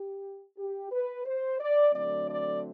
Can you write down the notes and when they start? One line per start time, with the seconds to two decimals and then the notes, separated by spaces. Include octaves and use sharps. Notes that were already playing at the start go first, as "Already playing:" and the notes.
Already playing: G4
0.58 G4
0.92 B4
1.26 C5
1.60 D5
1.94 D3 F#3 A3 C4 D5
2.28 D5